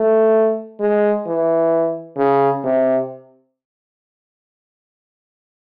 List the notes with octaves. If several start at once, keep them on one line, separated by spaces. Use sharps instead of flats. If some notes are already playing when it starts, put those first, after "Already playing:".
Already playing: A3
G#3
E3
C#3
C3